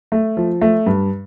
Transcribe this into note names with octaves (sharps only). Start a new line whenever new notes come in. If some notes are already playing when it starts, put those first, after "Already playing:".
A3
F3
A3
G2